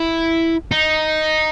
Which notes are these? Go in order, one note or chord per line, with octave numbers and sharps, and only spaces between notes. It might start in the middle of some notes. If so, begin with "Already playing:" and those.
Already playing: E4
D#4